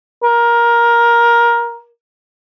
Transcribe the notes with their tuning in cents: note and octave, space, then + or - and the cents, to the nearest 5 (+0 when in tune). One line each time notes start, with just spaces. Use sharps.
A#4 +15